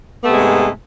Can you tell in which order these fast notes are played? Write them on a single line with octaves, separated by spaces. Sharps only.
B3 A3 C3 G#3 G#2